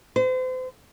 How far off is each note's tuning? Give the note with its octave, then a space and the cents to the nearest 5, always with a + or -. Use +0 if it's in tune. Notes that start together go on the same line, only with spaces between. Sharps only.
C5 -35